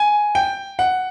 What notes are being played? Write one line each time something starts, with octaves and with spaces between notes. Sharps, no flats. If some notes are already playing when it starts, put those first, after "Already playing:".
Already playing: G#5
G5
F#5